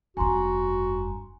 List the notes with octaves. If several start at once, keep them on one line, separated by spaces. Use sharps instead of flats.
F1 G2 F#4 G#5 A#5 C6